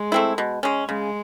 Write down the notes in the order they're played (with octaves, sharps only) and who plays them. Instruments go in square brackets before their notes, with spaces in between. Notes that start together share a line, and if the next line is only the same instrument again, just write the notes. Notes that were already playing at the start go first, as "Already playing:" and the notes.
Already playing: [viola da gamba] G#3
[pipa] A3 C4 E4
B2
G#3 C#4
[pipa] C#3 [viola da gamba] G#3